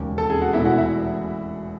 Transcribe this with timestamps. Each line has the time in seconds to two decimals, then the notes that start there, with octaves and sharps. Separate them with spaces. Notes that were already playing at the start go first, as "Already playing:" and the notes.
Already playing: E1 D#2 C#3
0.18 A4 A5
0.30 G#4 G#5
0.42 F#4 F#5
0.53 E1 E2 B2 A3 E4 E5
0.65 F#4 F#5
0.78 E4 E5